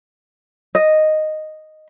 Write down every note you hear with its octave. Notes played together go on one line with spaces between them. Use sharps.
D#5